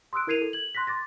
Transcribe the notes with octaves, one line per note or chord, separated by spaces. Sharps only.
C6 D#6 E6 F#6 D7
E4 A#4 G#6 C7 D#7 F7
A4
G#6 F#7
C6 F#6 A#6 B6
C6 D6 A6 A#6